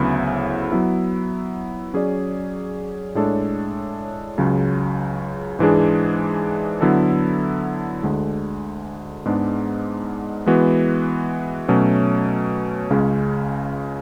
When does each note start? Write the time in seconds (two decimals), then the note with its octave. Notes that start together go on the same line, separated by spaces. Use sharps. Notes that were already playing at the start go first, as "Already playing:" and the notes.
Already playing: D2 C#3 F#3 B3 E4
0.72 F#3 B3 E4
1.94 F#3 C#4 G#4 D5
3.15 A2 G#3 D4 A4 C#5
4.38 C#2 C#3 F#3
5.59 G#2 E3 G#3 D4 G#4
6.81 D3 F#3 B3 E4 A4
8.03 D2 D3 G#3
9.25 G#2 G#3 B3 D4
10.46 E3 G#3 B3 F#4
11.68 B2 F#3 A3 C#4
12.91 C#2 C#3 G#3 C#4